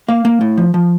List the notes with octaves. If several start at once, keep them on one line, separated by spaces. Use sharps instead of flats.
A#3 F5
A#3
A2
F3
F3